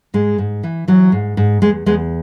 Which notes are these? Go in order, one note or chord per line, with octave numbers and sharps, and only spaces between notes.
G#2 G#3
G#2
E3
E3 F#3
G#2
G#2
E2 G#3
E2 G#3 B3